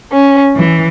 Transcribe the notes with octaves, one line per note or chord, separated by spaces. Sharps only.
C#4
E3